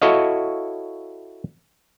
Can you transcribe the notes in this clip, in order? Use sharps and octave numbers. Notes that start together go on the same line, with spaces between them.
E4 F#4 A4 C#5 D#5 F5